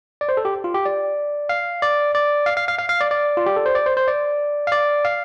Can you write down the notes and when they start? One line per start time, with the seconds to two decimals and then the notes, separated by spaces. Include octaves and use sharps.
0.21 D5
0.29 C5
0.37 A4
0.45 G4
0.64 F4
0.74 G4
0.85 D5
1.49 F5
1.82 D5
2.15 D5
2.46 F5
2.57 F5
2.68 F5
2.79 F5
2.89 F5
3.01 D5
3.11 D5
3.37 F4
3.46 G4
3.56 A4
3.66 C5
3.75 D5
3.86 C5
3.97 C5
4.08 D5
4.67 F5
4.72 D5
5.05 F5